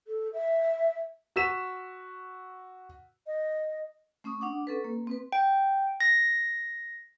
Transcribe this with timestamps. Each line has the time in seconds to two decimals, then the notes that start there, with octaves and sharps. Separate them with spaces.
0.07 A4
0.33 E5
1.36 F#4 E6 B6 E7
3.27 D#5
4.24 A3 C#4 C#6 D#6
4.41 D4 F#5 D6
4.67 C#4 A4 B4
4.84 A#3
5.07 C4 B4
5.32 G5
6.01 A#6